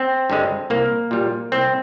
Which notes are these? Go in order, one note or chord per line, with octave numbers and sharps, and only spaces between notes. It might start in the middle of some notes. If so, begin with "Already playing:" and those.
Already playing: C4
G2 D3 G#3
C2 A#3
A#2 G3
C2 C4